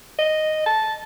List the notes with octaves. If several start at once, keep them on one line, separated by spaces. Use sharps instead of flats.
D#5
A5